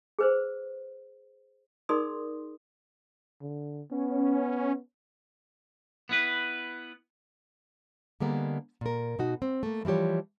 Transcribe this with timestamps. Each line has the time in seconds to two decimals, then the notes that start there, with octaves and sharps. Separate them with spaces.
0.19 G#4 B4 C5
1.89 D#4 G#4 A#4 D5 C6 D#6
3.42 D3
3.91 B3 C#4
6.09 B3 E4 B4
8.20 D3 G3 G#3 A#3 B3
8.81 A#2 A#4
9.19 B2 D#4 F#4
9.42 C4
9.63 A3 A#3
9.85 E3 F3 G3 G4 C#5